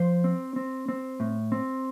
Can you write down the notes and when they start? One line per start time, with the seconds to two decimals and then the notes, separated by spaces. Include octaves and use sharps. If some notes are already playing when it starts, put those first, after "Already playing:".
Already playing: F3 C5
0.24 C4
0.56 C4
0.88 C4
1.20 A2
1.52 C4